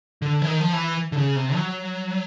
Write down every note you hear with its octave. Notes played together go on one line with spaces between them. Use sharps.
D3
E3
D#3
F3
E3
D3
C#3
C3
F#3